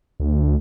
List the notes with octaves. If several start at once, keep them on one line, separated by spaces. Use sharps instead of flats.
D2